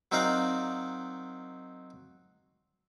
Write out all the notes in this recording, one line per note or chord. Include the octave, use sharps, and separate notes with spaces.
F#3 C4 D#4 A#4 D5 F5